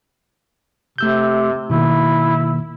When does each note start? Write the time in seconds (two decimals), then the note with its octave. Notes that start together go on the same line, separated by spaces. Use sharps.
0.98 C3 A3 E6 G6
1.70 B2 D#3 A#3 E4